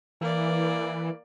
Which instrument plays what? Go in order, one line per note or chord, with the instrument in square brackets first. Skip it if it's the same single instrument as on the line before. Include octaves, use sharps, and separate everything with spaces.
[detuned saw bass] E3 [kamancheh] A#3 D5